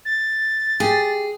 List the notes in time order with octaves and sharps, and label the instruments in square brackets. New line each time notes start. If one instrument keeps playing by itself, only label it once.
[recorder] A6
[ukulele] G4 [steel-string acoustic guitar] G#4